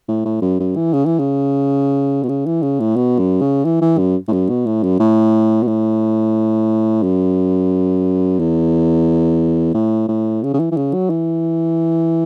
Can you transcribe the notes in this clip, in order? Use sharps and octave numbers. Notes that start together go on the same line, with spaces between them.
A2
A2
F#2
F#2
E3
C#3
E3
C#3
B2
C#3
E3
C#3
A2
B2
F#2
C#3
E3
E3
F#2
A2
F#2
B2
A2
F#2
A2
B2
A2
F#2
E2
A2
A2
C#3
C#3
E3
E3
C#3
F#3
E3